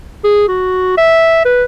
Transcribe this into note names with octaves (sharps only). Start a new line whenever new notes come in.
G#4
F#4
E5
B4